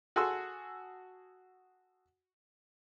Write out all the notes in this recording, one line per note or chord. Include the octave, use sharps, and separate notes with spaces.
F#4 G#4 A4 G#5 C6 E6